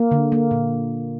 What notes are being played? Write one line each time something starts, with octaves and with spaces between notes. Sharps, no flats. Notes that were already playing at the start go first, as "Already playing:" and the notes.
Already playing: A#3
D3
A#3
A#2